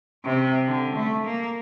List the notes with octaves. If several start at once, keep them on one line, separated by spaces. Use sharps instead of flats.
C3
D3
A3
A#3